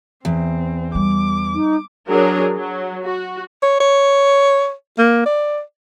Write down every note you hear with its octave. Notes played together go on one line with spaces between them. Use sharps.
E2 C4
G3 D6
D#4
F#3 D4 G#4 A#4
F#3
F#4
C#5
C#5
A#3
D5